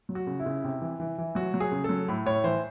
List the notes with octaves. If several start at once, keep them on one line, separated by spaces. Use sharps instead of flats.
F#3
F#4
C#3
E4
C#3
C3
E3
E3
E3
F#3 F#4
F#3
G#4
C#3
F#3 A4
A2
A2 C#5
E3 C5